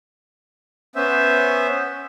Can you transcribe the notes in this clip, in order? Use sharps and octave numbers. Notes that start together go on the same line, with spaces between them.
B3 C#4 C5 E5